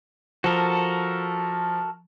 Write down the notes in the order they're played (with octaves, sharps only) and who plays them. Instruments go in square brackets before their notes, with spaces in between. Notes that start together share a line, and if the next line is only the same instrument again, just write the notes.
[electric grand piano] F3 [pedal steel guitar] F#4 A4 A#4